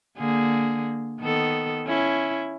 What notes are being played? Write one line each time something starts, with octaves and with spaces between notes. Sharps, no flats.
D3 A#3 G#4
D#3 B3 A4
C#4 E4